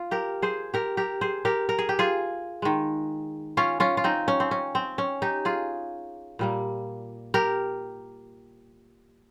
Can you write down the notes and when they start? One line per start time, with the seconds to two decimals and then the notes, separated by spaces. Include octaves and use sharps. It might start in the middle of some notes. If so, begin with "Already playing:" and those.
Already playing: F4
0.11 G4 A#4
0.42 G#4 C5
0.74 G4 A#4
0.97 G4 A#4
1.21 G#4 C5
1.45 G4 A#4
1.69 A#4
1.79 G#4
1.89 G4
1.99 F4 G#4
2.62 D#3 G#3
3.57 C#4 F4
3.80 C#4 F4
3.97 F4
4.04 C4 D#4
4.28 C#4
4.40 C4
4.51 C#4
4.75 C4
4.98 C#4
5.22 D#4 G4
5.45 F4 G#4
6.39 A#2 G3 A#3
7.34 G4 A#4